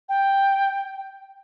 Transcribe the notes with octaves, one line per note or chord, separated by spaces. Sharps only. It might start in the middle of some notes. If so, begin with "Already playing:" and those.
G5